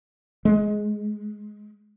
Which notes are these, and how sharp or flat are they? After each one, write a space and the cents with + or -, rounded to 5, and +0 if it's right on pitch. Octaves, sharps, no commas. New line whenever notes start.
G#3 +10